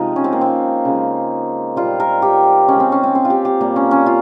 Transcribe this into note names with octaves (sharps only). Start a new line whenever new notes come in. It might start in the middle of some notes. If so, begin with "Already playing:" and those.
Already playing: C3 F3 G#3 D#4 F4
C#4
C4
A#3
C4
C#3 F3 G#3
A#2 G3 F4
A#4
G4
C#3 G#3 C#4
C4
C#4
C4
C4
F4
G4
G4
A#2 G3 A#3
C#4
C#4
F4